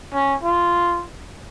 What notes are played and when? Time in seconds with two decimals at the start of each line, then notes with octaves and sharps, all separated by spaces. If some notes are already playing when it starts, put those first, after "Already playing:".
0.14 C#4
0.43 F4